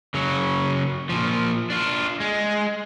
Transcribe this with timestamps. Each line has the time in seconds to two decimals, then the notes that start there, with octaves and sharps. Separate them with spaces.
0.14 C#3 F#3
1.09 A#2 F3
1.70 D4 F4
2.20 G#3